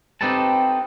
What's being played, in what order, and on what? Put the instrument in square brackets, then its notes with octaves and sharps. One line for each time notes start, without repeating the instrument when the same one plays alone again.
[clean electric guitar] C4 D#4 G4 A4 B4 A5